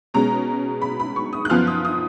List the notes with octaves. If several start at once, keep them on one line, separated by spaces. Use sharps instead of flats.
B2 G#3 C#4 A#5
B5
B5
C#6
D#6
F#6
F#2 F3 B3 F4 F6
D#6
D#6